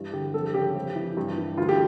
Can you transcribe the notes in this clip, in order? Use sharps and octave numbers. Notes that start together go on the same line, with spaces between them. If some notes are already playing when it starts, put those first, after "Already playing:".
Already playing: G2 E3
D3 G4
F2 A4
C#3 G4
F2
E3
G2
E3
D2 F4
G4